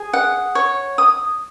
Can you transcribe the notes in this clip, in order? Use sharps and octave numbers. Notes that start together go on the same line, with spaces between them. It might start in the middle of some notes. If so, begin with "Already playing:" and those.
Already playing: G#4
F#5
C#5
D#6